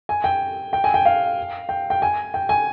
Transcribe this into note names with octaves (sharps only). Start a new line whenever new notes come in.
G#5
G5
G5
G#5
G5
F5
G5
G5
G#5
G5
G#5